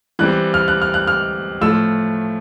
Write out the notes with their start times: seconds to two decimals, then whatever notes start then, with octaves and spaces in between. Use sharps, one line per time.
0.19 E3 G3 C4 F#6
0.54 F6
0.68 F#6
0.82 F6
0.94 F#6
1.07 F6
1.61 A2 F3 A3 E6